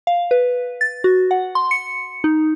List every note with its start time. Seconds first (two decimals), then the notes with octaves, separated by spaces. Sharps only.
0.07 F5
0.31 B4
0.81 A6
1.04 F#4
1.31 F#5
1.55 C6
1.71 C#7
2.24 D#4